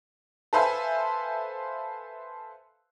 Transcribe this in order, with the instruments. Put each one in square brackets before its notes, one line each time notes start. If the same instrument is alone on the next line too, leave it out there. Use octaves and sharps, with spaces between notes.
[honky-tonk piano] A4 B4 C5 E5 F5 G#5